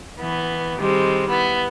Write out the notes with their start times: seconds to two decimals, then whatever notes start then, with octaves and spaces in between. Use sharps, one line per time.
0.20 E3 B3
0.78 D#3 G3 G#3 C4
1.29 B3 E4